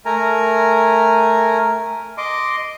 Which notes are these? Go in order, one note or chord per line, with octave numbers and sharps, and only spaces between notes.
A3 A#4 G#5 A#5
D#5 C6 D6